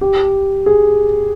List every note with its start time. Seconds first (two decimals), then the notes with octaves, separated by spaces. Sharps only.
0.01 G4
0.66 G#4